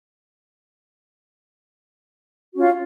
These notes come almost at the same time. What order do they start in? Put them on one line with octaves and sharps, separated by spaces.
F#4 C#4 F4